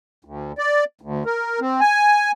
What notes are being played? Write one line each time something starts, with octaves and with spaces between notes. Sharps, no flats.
D2
D5
D2
A#4
C4
G#5